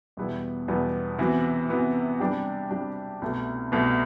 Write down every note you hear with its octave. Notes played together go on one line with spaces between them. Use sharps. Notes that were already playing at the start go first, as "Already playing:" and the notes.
E2 B2 G3 B3 E4
E2 B2 G3 B3 E4
C3 E3 B3 F#4
C3 E3 B3 F#4
C3 G3 D4 G4
C3 G3 D4 G4
C2 B2 A3
C2 B2 A3